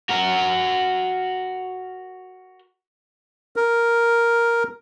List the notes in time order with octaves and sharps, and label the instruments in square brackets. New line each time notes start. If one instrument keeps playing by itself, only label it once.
[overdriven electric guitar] F#4 A#4
[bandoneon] A#4